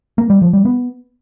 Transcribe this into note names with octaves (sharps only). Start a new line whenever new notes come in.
A#3
G3
F3
G3
B3